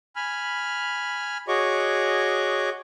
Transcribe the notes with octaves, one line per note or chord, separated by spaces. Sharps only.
G#5 B5 F6
F#4 G#4 C#5 D#5 C#6 D6